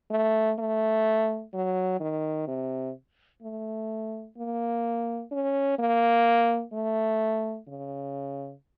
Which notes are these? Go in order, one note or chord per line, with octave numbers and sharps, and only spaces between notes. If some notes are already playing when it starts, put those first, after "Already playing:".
A3
A3
F#3
D#3
C3
A3
A#3
C#4
A#3
A3
C#3